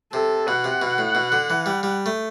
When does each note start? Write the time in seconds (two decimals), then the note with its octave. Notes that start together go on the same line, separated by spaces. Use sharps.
0.13 C3 A4
0.47 B2 F#5
0.64 C3
0.82 B2
0.98 A2
1.15 B2
1.32 D3
1.50 E3
1.66 G3
1.83 G3
2.06 A3